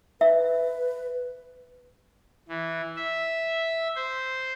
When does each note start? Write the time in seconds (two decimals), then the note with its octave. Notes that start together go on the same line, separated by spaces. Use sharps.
0.21 B4 E5
2.49 E3
2.96 E5
3.96 C5